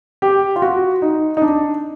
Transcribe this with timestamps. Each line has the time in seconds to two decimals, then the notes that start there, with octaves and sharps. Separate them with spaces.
0.22 G4
0.56 F4
0.62 F#4
1.02 D#4
1.37 D#4
1.42 D4